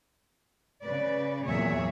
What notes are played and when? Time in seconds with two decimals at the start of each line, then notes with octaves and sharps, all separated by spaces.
0.84 C#3 B4 D5
1.46 E2 A#2 F#3 G#4 C#5 E5